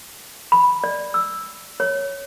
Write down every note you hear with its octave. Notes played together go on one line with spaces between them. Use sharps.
B5
D5
E6
C#5